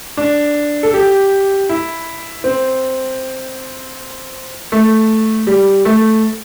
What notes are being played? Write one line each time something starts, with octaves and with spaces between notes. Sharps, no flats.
D4
A4
G4
E4
C4
A3
G3
A3